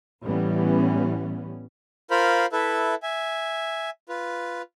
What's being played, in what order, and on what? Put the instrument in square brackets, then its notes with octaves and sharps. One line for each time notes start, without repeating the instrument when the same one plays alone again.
[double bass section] A1 E3 G3 B3 C#4
[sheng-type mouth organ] F4 A#4 C5 F5 B5
E4 A4 B4 E5
E5 G#5
F4 B4